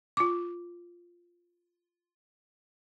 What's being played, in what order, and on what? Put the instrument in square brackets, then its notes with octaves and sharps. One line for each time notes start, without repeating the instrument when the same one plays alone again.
[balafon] F4 D6